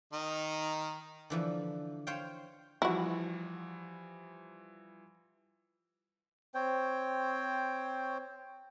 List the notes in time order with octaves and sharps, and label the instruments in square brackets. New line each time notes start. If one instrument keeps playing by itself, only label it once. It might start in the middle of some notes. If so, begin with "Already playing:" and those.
[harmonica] D#3 D#4
[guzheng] D3 E3 F3
C5 C#5 F5 G5
[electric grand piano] E3 F3 G3 [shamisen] E4 F#4
[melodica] C4 C5 C#5 G5